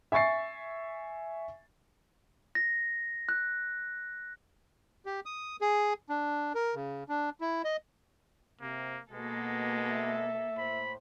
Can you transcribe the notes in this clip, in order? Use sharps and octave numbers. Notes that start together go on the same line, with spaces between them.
E5 G#5 C#6 A6 C7
A#6
F#6
G4
D#6
G#4
D4
A#4
C#3
D4
E4
D#5
C3 A#3
B2 G#3 A#3 A4
E5
A2 C5 B5